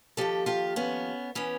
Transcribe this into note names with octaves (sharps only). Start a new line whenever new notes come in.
D#2 C#3 F3 G4 A4
F4 G4
B3 C#4
E3 B3 C#4